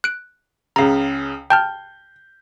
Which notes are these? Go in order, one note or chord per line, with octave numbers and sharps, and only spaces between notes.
F#6 D7
C#2 C#3 F5 A#5
G5 A5 F6 G6